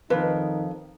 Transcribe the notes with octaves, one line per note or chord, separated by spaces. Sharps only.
F2 D#3 D#4 B4